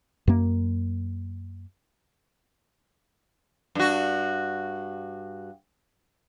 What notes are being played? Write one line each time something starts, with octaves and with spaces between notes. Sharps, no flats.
F#2 A#3
G2 F#4